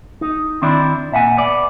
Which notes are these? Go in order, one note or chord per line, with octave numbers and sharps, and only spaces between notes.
D#4
D#3 C4 D4 E4 D5
A#2 E5 F#5 G#5
B3 D5